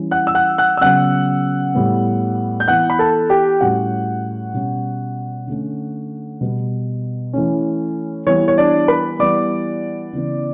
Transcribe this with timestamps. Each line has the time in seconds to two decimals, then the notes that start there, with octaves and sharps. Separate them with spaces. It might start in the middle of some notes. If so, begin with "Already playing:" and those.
Already playing: E3 G3 C#4
0.11 F#5 F#6
0.27 E6
0.35 F#5 F#6
0.58 F#5 F#6
0.77 E6
0.81 C#3 F#3 B3 F#5 F#6
1.75 A2 G3 B3
2.60 G6
2.68 E3 B3 F#5 F#6
2.90 B5
2.99 A4 A5
3.30 G4 G5
3.61 A2 G3 C#4 F#4 F#5
4.54 B2 G3 C#4
5.47 D3 A3 C#4
6.41 B2 G3 B3
7.33 E3 A3 C#4
8.27 E3 G3 B3 C#5
8.48 C#5
8.58 D4 D5
8.88 B4 B5
9.19 E3 G3 B3 D5 D6
10.13 C#3 E3 B3